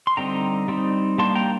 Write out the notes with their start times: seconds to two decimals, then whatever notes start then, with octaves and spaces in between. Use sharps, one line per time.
0.07 C6
0.17 D3 G3 C4 D#4 G5 A#5
0.68 G3 C4 D#4
1.18 G3 A#3 D4 A5 C6
1.35 G5 A#5